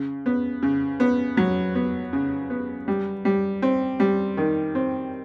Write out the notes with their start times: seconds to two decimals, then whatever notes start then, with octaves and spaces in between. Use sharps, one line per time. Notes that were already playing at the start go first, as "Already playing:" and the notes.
Already playing: C#3
0.26 B3
0.63 C#3
1.00 B3
1.37 F#3
1.75 B3
2.13 C#3
2.50 B3
2.88 G3
3.25 G3
3.62 C4
4.00 G3
4.37 D#3
4.75 C4